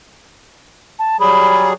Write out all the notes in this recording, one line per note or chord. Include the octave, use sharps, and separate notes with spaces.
A5
F#3 G3 G#4 B5